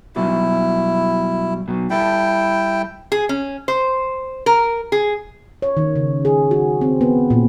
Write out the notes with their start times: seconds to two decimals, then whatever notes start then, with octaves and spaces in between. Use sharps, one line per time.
0.16 B2 F#3 G3 E4
1.68 B2 F#3
1.90 G3 E4 A4 G5
3.12 G#4
3.29 C#4
3.68 C5
4.46 A#4
4.92 G#4
5.62 C#5
5.77 D#3
5.96 C#3
6.25 G#4
6.51 F#4
6.81 C4
7.01 B3
7.30 A#2